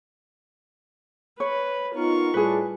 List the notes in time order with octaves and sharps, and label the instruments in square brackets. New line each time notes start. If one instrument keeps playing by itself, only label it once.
[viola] B4 [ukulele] C#5
[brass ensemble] B3 D#4 A#4 [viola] F4 C#6
[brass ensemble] A2 G3 D4 [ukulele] G#4 B4